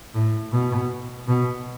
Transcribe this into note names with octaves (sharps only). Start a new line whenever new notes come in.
A2
B2
B2